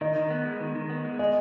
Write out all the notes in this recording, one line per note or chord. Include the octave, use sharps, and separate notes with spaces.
D#3 D#5
D#3
B3
G#3
D#3
D#3
B3
G#3
G#4 D#5